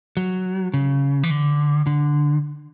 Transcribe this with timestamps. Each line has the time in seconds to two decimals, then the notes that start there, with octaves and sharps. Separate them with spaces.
0.17 F#3
0.74 C#3
1.23 E3
1.30 D3
1.87 D3